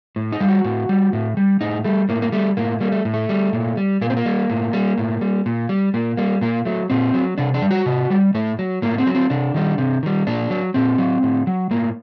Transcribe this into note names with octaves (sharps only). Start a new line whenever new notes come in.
A2
D#4
G3
F#4
A2
G3
A2
G3
A2 D#4
G3 A3
A2 A#3
A#3
G3 A3
A2 A#3
G3 A#3
A3
A2
A3
G3
A#2
G3
A#2 A#3
C4
A#3
G3
A2
G3
A2
G3
A#2
G3
A#2 A#3
G3 A#3
A#2 A#3
F#3 A3
A#2 C4
F#3
C3 D4
D4
G3
F#4
C3
G3
A2 A3
F#3
A2 A#3
C4
F#3
C4
C3 D4
D#3 G3
C3
D#3 G3
A#2 D4
F#3
A#2 C4
F#3
A2
F#3
A2 A#3